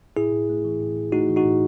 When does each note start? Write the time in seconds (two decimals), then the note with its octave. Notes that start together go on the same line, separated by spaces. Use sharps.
0.17 A2 E4 G#4
0.33 A2
0.49 A3
0.65 E3
0.81 A2
0.96 A2
1.12 A3 D#4 F#4
1.29 E3
1.36 D#4 F#4
1.45 A2